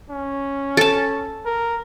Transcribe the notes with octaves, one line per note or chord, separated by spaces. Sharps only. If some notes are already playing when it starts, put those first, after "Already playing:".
C#4
A4 A5
A#4